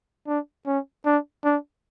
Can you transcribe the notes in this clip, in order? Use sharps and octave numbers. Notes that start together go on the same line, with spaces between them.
D4
C#4
D4
D4